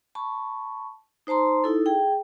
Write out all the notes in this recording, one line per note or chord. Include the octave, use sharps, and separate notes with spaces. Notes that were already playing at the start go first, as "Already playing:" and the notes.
A5 B5 C#6
D#4 C5 A5 A#5 C6
D#4 E4 A4
G#4 G5